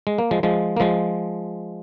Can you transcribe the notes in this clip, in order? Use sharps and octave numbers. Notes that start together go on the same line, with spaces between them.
G#3
A#3
F3 G#3
F3 G#3
A#3
F3 G#3